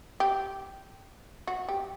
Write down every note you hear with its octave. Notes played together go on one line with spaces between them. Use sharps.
G4
F#4
G4